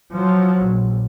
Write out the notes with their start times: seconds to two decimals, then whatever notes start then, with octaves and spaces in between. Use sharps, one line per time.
0.12 F3 F#3
0.61 A#1